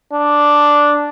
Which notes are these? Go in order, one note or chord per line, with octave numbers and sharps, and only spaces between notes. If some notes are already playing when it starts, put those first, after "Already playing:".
D4